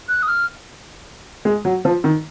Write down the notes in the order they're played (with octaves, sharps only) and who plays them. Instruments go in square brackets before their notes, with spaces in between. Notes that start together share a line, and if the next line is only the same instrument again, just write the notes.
[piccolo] F#6
D#6
F6
[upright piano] G#3
F#3
F3
D#3